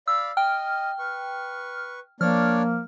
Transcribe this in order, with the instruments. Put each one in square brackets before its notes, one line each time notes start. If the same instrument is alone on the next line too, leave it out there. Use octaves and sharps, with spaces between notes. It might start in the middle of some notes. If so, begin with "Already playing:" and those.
[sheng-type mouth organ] D5 F5 B5 [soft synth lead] E6
[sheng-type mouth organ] D#5 [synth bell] G5 [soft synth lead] F6
[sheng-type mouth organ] B4 C#6
[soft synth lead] F3 [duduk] A#3 [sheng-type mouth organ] D4 C#5 D5 [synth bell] F6